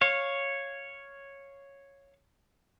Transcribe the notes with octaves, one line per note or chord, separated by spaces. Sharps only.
C#5 F5